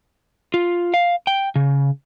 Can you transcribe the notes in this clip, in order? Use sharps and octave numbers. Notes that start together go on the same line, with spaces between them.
F4
F5
G5
C#3